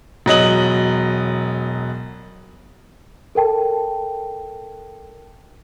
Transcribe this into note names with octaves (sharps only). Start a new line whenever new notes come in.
E1 F#3 D#5 F#7
A4 A#4 G5 A5